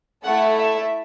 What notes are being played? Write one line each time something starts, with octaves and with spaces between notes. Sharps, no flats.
A3 E4 A4 F#5
E5